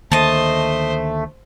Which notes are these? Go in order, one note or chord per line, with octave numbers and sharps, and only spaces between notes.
D2 D#3 A3 A#3 C5 D#5 A5